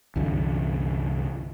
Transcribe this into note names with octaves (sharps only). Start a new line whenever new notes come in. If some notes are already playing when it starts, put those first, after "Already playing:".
C2 F#2 D3 E3